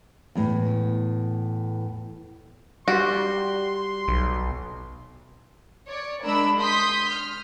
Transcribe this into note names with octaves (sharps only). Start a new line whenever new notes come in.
E2 A2
G3 F#4 C6
B1
C#5 D5
G#3 D4 A#4 B5 E6
C6 D#6 G6 B6
F6